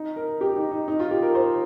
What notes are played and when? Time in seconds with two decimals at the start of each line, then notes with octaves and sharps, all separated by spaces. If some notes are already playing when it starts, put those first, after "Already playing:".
Already playing: D#4
0.16 A#4
0.41 G4
0.56 D#4
0.71 D#4
0.88 D#4
0.99 F4
1.11 G4
1.22 A#4
1.35 C5